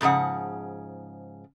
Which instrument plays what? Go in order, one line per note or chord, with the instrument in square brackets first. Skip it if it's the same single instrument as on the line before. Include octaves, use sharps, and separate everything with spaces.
[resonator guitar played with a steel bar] F2 G#2 C#3 F3 F#5